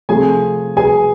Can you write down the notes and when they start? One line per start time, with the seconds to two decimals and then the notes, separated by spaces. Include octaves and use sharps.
0.09 C3 F3 A3 G#4 G#5
0.77 G#4 G#5